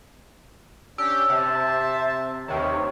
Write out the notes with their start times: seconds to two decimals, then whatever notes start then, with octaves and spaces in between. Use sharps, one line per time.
0.98 C#4 D4 G4 E6
1.30 C3 C5 E5 A5
2.48 D#2 C3 D#3 G4 B4 C#5